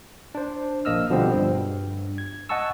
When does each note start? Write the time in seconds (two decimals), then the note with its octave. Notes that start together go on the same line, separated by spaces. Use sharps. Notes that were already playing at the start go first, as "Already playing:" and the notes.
0.35 D4 C5
0.85 A#1 A#3 D#5 E6 F6
1.10 B2 D3 F3 G3 C4
1.35 G2
2.18 G#6
2.49 D#5 F#5 G#5 A5 C#6 E6